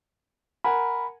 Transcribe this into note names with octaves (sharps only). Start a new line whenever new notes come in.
A#4 F#5 G#5 B5